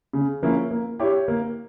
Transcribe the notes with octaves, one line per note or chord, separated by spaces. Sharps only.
C#3
F3 A#3 C#4 E4
A#3
E4 G4 C#5
A#3